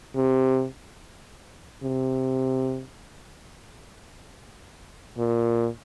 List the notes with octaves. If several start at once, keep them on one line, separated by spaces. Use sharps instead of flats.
C3
C3
A#2